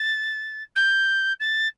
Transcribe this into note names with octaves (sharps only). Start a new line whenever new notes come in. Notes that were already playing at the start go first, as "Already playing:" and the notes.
Already playing: A6
G6
A6